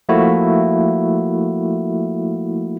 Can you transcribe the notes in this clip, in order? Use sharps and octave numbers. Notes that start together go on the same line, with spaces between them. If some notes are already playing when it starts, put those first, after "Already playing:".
F3 A3 A#3 E4 F#4